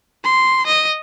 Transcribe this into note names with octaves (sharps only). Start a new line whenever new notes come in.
C6
D#5